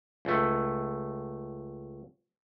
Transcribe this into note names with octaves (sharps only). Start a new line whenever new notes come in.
C#2 A3